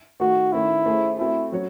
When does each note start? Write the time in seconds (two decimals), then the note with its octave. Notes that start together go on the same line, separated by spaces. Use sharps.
0.20 D#3 A3 D#4 F#4
0.53 D#3 A3 C#4 E4
0.86 A3 C#4 G#4 C5
1.18 A3 C4 E4 F#4 A4
1.52 F#3 C#4 F#4 C#5